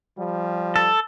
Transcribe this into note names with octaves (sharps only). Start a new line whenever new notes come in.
F3 G3
A4